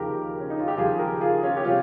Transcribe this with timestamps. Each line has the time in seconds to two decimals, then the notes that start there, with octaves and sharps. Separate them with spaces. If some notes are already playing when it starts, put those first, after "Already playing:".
Already playing: D#2 C#3 F3 G4 A#4
0.40 C#4
0.50 D#4
0.60 F4
0.68 G4
0.77 D#2 C#3 F3 F4 G#4
0.99 G4 A#4
1.21 F4 G#4
1.43 C#4 F4
1.57 G4
1.65 C3 F3 C#4 F4